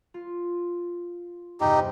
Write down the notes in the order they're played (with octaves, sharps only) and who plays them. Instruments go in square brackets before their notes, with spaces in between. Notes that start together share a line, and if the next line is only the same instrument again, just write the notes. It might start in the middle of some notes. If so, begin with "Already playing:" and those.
[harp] F4
[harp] E2 G2 C3 [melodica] D#4 G4